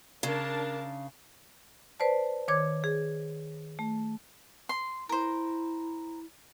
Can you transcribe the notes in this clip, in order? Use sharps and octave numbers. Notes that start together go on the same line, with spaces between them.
C#3 D4 A#4 A5
B4 C5 D5 A5
D#3 C#5 D6 G#6
G#4
A3
C6
E4 A#4 C5